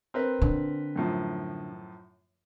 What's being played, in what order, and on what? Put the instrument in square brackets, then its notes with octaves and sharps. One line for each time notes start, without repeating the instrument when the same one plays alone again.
[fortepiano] C4 A#4 B4
[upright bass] D3
[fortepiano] F#2 A2 F3